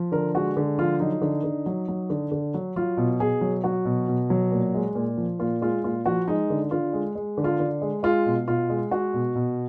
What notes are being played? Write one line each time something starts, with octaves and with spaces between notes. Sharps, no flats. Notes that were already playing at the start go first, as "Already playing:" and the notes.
Already playing: F3
D3 A#4
G#3 F#4
D3
F3 F4
F#3 D#4
D3
D3
F#3
F#3
D3
D3
F#3
F#3 F4
B2
B2 G#4
F#3
F#3 F#4
B2
B2
F#3
A#2
G#3
A#2
F3
A#2 F4
G#3 F4
A#2 F4
F3 F#4
G#3 D#4
D3
D3 F4
G#3
G#3
D3
F4
D3
G#3
G#3 F4
B2
B2 F4
G#3
G#3 F#4
B2
B2